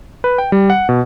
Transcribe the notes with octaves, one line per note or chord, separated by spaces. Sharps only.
B4
G5
G3
F#5
B2